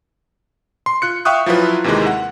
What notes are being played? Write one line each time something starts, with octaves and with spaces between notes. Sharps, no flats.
C6
F4 F#6 C#7
E5 F5 G5 C#6 D#6 F#6
F3 F#3 E4 F4 B4
D#2 C3 D#3 E3 G#3
F#5